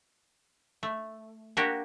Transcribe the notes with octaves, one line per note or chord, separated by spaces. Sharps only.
A3
A#3 D4 F#4 G4